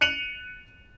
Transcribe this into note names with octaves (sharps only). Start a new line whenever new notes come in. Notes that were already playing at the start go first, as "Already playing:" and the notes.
F#6 C#7 D#7 F7 F#7